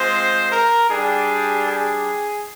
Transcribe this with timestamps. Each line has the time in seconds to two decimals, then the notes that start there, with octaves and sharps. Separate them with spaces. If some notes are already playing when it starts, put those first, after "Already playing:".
Already playing: G#3 C4 F4 C5
0.50 A#4
0.89 G3 D4 G4 G#4
1.65 G#4